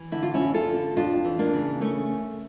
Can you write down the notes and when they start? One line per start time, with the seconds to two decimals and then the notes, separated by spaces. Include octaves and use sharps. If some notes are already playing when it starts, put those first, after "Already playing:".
Already playing: E3
0.12 D3 E4
0.23 F4
0.34 C#4 E4
0.40 F2
0.54 F4 A4
0.68 D3
0.96 F2 D4 F4
1.25 E3
1.39 A#3 D4
1.53 C#3
1.81 A3 C#4